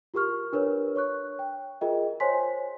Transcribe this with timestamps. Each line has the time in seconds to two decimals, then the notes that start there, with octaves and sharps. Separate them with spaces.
0.14 F4 G4 A#4 C#6 F6
0.53 D4 A#4 B4 C#5
0.96 C#5 C#6 F#6
1.39 G5
1.81 F4 G#4 A#4 D#5 E5 G5
2.20 C5 C#5 G#5 C6 B6